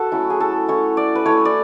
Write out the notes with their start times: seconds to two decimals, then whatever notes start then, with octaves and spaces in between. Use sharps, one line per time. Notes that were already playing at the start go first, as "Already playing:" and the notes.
Already playing: F#4 A4 B4
0.12 F#3 A3 C#4 E4
0.30 G#4
0.40 A4
0.68 A3 C#4 E4 C#5
0.97 D5
1.15 B4
1.26 A3 E4 C#5
1.45 D5